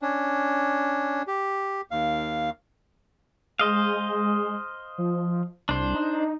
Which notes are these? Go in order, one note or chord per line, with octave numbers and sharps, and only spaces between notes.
C#4 D4
G4
D#2 F5
G#3 C5 D#5 F5
F3
C2 D4 C5
D#4